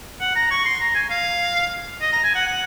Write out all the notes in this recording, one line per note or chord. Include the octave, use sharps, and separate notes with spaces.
F#5
A#5
C#6
C6
A#5
G#5
F5
D#5
A#5
G#5
F#5
F#5